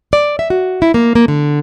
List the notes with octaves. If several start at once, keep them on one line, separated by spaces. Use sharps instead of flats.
D5
E5
F#4
E4
A#3
A#3
D3